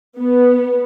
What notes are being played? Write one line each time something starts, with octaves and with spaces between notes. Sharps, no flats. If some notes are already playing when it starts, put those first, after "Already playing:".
B3